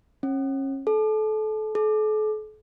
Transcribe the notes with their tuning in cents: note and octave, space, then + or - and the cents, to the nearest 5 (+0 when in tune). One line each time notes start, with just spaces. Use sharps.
C#4 -35
A4 -30
A4 -45